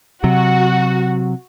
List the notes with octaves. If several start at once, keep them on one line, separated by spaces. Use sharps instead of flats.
C3 F#3 F#4